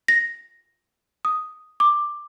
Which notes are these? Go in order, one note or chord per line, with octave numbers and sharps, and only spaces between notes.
A#6
D#6
D6